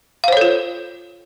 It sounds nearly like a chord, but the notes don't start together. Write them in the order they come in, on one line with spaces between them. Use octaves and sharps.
F5 C5 C#5 A4 F4